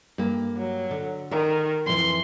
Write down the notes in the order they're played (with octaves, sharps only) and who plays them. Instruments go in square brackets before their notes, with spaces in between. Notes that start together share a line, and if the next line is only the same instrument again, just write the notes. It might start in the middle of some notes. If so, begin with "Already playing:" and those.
[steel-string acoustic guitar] G2 A#3
[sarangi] F#3
[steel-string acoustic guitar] D3
[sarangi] D#3 [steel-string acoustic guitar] A#4
[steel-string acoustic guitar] F2 E3 [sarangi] C6